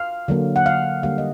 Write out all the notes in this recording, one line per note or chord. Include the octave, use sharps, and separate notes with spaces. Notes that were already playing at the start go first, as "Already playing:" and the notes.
Already playing: F5
D3 F#3 A#3
F#5
F5
D3 G3 A#3 F5
D#5